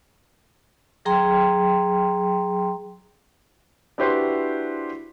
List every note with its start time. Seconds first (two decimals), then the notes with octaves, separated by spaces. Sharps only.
1.05 F#3 G#4 G5 A#5 C6
3.98 D4 E4 F#4 G4 B4 C5